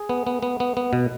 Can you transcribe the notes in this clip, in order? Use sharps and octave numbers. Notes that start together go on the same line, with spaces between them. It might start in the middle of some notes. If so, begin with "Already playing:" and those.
Already playing: G#4
B3
B3
B3
B3
B3
B2